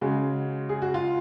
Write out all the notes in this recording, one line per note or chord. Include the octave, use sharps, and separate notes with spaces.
C#3 G#3 F#4
G#4
F#4
F4